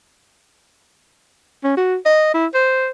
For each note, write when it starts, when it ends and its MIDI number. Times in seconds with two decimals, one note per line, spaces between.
1.64 1.76 61
1.77 1.95 66
2.05 2.31 75
2.34 2.46 64
2.54 2.90 72